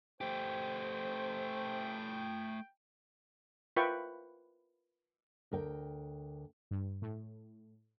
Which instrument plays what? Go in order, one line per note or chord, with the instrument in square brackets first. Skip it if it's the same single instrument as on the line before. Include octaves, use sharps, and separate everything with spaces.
[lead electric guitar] A3 G4 [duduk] C5 [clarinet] G5
[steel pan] F4 A#4 B4 E5 G5 C#6
[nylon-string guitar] D2 A#4 G5
[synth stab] G2
A2